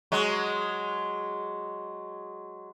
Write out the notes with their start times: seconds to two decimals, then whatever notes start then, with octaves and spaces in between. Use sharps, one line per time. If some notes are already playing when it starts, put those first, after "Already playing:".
0.12 F#3 G#3